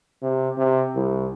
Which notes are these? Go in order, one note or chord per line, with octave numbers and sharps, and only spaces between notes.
C3
C3
C2